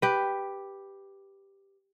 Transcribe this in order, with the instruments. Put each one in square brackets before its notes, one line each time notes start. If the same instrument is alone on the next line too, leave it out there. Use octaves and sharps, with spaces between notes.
[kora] G4 B4